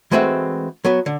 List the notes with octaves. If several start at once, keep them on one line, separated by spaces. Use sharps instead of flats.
E3 G#3 A3 C4 F#4 E5
F#3 B3 B4
D3